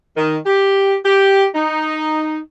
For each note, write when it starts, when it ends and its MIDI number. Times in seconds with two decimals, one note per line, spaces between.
0.17 0.37 51
0.46 0.96 67
1.05 1.46 67
1.55 2.39 63